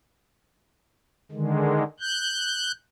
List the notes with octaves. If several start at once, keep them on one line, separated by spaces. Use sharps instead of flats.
D3 D#3 G#3
F#6 G6